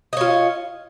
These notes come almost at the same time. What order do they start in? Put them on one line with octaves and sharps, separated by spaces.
D#5 C#5 F4